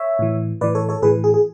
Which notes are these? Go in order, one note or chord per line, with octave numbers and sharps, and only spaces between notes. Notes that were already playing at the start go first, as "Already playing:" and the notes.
Already playing: C#5 E5
A2 E3
A2 E3 B4 D5
A4 C#5
A4 C#5
A2 E3 G#4 B4
G#4
G#4